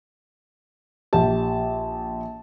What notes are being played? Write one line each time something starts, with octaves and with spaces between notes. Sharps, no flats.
A#1 G4 A5